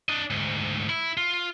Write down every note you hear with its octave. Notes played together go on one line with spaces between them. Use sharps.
D4 D#5
D2 G#2
E4
F4